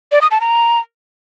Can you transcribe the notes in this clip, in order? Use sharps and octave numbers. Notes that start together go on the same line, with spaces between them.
D5
D#6
A5
A#5